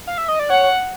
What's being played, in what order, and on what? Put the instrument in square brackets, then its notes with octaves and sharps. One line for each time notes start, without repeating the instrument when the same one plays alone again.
[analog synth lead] F5
E5
D#5
D5
[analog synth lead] C#5 [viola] F#5